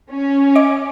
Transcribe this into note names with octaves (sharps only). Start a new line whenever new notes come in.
C#4
D#5 D6 D7